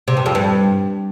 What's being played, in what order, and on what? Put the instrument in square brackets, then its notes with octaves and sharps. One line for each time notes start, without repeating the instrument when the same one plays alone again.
[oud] C3
G2
F2
G2